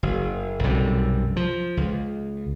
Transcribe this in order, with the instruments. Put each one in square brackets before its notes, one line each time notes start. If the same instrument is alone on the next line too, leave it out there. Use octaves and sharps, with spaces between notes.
[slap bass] F#1
B1 F#2 C3 G3
F3
C#2